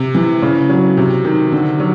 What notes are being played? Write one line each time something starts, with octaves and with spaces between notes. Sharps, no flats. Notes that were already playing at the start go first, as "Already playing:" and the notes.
Already playing: C3
E3
C#3
F#3
C3
D#3
D3
F#3